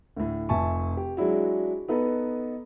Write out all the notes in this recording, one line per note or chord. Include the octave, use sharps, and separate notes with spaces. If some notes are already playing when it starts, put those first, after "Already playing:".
D2 A2
F1 E5 G#5 A5 C#6
G4
F#3 G#3 D4 E4 F#4
B3 D#4 A4 B4